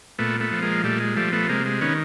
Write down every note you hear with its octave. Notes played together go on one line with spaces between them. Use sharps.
A#2 A3 B3
A3 B3
F3
G#3 A#3
A#2 G3 A3
G#3
F3 G3 A3
A3 B3
C3 G#3 A#3
G#3
D#3 B3 C#4